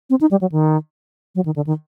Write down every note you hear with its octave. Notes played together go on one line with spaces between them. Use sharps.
C4
D#4
G3
F#3
D#3
F#3
D#3
D3
D#3